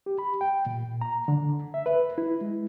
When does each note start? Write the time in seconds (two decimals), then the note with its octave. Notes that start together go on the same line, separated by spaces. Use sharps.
0.06 G4
0.19 B5
0.41 G5
0.66 A#2
1.01 A#5
1.28 D3
1.74 E5
1.86 B4
2.18 E4
2.41 G#3